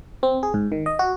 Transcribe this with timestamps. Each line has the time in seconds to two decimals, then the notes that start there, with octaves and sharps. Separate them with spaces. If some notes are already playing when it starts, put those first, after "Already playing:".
0.23 C4
0.43 G#4
0.54 G#2
0.72 D#3
0.86 D#5
0.99 F#4